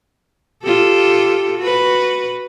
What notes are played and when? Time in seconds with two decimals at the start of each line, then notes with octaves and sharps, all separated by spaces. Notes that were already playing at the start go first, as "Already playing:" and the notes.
0.63 F4 G4 A4
1.59 F#4 B4